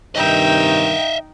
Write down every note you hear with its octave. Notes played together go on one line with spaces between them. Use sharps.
G2 C3 D#3 D#4 D#5 E5 G5